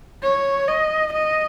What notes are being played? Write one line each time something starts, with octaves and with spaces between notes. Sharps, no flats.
C#5
D#5
D#5